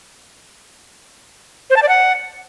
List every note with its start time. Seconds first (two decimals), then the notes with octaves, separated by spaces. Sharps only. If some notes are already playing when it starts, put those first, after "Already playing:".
1.70 C5
1.76 A5
1.82 D5
1.89 F#5